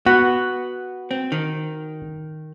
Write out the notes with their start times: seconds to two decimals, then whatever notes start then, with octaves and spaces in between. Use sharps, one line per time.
0.06 B3 F#4
1.11 C4
1.32 D#3